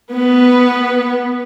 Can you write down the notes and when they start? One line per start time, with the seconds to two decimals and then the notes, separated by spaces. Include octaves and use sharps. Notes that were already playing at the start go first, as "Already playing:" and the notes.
0.13 B3 B4